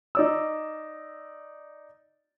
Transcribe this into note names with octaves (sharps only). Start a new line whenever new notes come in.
D#4 D5 E6